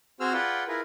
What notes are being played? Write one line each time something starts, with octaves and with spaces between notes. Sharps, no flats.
C4 F#4 G#4 C5 E6 F6
F4 G#4 B4 D5 F#5 G5
E4 F4 G#4 A#4 B4